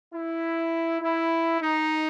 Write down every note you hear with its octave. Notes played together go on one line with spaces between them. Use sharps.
E4
E4
D#4